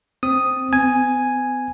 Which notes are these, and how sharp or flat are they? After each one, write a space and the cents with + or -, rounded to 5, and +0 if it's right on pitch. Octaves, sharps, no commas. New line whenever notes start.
C4 +0 D#6 +0
B3 +45 G#5 +0